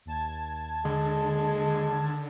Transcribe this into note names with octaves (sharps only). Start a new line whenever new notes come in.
D#2 A5 G#6
D3 G#3